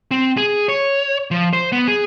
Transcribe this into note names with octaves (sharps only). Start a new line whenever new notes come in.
C4
G#4
C#5
F3
C5
B3
G#4